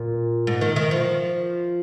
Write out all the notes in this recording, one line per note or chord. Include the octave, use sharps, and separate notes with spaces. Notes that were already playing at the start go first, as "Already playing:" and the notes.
Already playing: A#2
G#2
D#3
D#3
F3